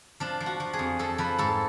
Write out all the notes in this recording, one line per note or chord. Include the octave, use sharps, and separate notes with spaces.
F3 D4
F3
F#4
F3
G#4
F2
F3 A4
F3 B4
G#2 A4